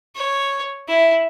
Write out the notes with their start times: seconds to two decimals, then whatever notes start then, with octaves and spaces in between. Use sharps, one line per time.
0.15 C#5
0.88 E4